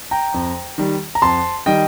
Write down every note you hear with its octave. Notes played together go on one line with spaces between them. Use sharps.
G5 A#5
F2
D#3 G3
A#5
F2 A5 C6
D#3 G3 D#5 G5